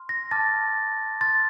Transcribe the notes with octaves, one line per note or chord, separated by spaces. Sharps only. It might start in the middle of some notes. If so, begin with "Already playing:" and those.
Already playing: C6 F6
A#6
A5 D6 F6 A6
C6 F6 A6